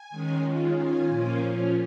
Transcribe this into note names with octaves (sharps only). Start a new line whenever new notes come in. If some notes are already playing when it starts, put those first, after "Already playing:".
Already playing: G#5
D#3 G#3 C#4
D#3 G#3 C#4 F4
D#3 C#4 F4 G#5
A#2 F3 A#3 C#4 F4
A#2 F3 C#4 F4